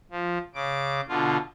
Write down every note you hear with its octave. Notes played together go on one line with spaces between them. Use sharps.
F3
C#3 D6
B2 D3 F4